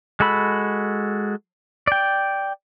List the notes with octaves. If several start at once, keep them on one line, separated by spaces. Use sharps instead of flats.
G#3 F#4 A4 B5
D5 G5